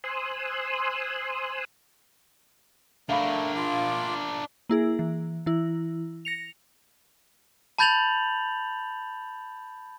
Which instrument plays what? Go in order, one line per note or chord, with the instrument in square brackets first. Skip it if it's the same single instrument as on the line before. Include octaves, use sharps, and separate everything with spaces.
[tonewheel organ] C5 G#5 C6 D#6 E6 F#6
[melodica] A3 [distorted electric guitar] D4 A#4 [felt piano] E5 F5 B5
[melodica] F4 D6
[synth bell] A#3 E4 G#4
E3
E3 E4
A#6 C#7 F7
[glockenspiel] A5 B5 G6 A6 F7 F#7